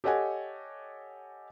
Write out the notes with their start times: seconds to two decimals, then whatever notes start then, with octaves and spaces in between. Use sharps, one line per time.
0.04 G4 A4 C#5 D#5 F#5 G#5